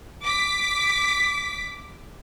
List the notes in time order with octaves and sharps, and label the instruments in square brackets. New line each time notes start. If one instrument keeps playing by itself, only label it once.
[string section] D6 B6